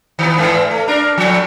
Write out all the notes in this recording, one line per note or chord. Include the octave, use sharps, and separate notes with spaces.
D#3 B3
G#2 E3
A3
D4 A#4
A2 F3